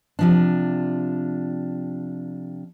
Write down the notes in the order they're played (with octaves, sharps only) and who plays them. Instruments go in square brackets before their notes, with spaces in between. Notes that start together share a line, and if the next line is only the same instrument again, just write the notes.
[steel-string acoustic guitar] C3 F3 D4